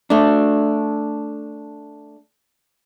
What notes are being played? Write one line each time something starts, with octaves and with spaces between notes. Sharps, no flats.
A3 D4